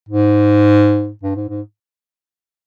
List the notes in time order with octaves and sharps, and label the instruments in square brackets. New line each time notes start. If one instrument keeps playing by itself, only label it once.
[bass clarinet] G#2
G2
G#2
G#2